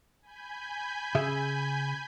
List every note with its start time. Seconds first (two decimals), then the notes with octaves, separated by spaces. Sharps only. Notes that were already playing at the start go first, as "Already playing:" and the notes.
0.22 G#5 B5 G6
1.15 C#3 G#4 E5